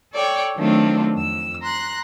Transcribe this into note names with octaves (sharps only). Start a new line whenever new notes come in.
A4 C#5 D5 G5
D#3 F#3 A3 C4 D4 F4
F2 E6
A#5 C6 F#6